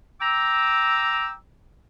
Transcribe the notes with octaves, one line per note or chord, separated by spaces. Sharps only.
G5 A#5 D6 E6